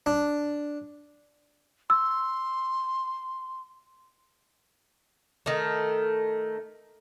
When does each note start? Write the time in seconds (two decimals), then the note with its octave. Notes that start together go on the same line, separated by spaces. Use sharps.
0.06 D4
1.90 C6 E6
5.46 D#3 A3